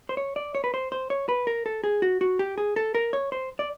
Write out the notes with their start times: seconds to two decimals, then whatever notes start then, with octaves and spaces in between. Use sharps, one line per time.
0.09 C5
0.17 C#5
0.36 D5
0.55 C#5
0.64 B4
0.74 C5
0.92 C5
1.10 C#5
1.29 B4
1.47 A#4
1.66 A4
1.84 G#4
2.02 F#4
2.21 F#4
2.39 G4
2.58 G#4
2.76 A4
2.95 A#4
3.13 C#5
3.32 C5
3.59 D5